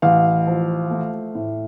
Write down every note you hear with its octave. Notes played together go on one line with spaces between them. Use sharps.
A1 F5
F3
A3
A2